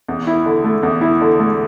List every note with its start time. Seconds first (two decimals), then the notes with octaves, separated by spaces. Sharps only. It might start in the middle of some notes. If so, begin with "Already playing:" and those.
0.08 E2
0.27 E4
0.46 D3
0.64 A3
0.83 E2
1.01 E4
1.21 D3
1.39 A3